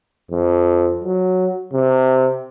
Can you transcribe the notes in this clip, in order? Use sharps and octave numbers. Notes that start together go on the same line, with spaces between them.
F2
F#3
C3